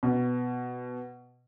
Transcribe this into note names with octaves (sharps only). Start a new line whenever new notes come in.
B2